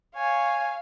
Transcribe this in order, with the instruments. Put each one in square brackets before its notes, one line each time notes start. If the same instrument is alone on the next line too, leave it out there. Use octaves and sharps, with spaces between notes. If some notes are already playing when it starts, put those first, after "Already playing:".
[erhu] C#5 [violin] F5 [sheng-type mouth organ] G#5